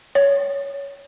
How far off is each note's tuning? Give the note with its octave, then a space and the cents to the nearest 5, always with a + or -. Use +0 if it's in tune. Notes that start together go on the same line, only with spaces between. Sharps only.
C#5 +10